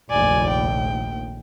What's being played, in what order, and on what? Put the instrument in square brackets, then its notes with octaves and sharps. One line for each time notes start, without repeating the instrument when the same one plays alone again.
[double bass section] F1 A#1 D#2 [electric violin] D5 G#5
[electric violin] G5